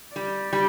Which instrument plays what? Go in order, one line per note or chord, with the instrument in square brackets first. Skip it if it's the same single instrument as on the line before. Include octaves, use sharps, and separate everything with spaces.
[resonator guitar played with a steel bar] G3 [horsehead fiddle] D5
[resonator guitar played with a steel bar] G3